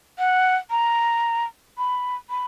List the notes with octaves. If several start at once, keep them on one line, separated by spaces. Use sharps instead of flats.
F#5
A#5
B5
B5